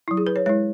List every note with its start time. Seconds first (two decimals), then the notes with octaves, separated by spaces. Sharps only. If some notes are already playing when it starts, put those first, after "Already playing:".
0.08 E4
0.11 F#3
0.17 G#4
0.27 B4
0.36 C#5
0.46 G#3 E4 C#5